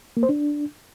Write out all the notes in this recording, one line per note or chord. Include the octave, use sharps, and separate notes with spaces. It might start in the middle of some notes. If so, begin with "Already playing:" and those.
A#3
C5
D4